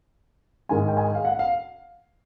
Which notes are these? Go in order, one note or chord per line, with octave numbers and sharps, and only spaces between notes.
G#2 D#3 G#3 G#5
G5
G#5
F5
F#5
F5